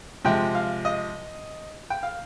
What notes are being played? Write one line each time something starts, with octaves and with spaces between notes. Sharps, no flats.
C3 F3 G#3 G5
F5
D#5
G5
F5